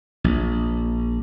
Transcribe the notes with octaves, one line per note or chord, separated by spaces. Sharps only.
A#1